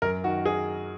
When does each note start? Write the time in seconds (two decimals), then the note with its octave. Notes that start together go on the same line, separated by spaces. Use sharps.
0.02 F#2 A#4
0.24 D#3 F#4
0.46 G#4